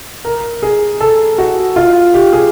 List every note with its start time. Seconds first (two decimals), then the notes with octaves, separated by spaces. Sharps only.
0.25 A#4
0.62 G#4
1.01 A4
1.38 F#4
1.76 F4
2.14 G4
2.33 G#4